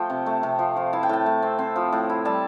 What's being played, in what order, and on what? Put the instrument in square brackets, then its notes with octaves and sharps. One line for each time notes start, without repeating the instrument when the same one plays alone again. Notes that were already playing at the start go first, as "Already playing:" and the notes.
Already playing: [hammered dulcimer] F3 A3 G5
C3
A3
C3
F3
F3
E4 A5
G5
A2 A5
A2
C4
C4
F3
A2
E4
G3 A5